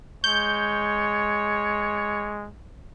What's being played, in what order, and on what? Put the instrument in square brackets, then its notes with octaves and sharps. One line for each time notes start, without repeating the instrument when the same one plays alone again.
[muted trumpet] G#3 [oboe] C#5 [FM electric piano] G6